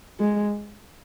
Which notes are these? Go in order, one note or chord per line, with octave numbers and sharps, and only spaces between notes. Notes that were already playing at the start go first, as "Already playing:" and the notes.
G#3